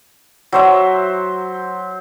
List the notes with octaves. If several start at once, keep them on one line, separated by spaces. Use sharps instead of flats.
F#3 C5 E5